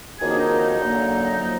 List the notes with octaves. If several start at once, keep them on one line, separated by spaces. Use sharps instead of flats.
F2 D#3 F#3 A#3 G#4
D4
D#4
D#4
F#2 D3 F#3 A#3
F3 A#3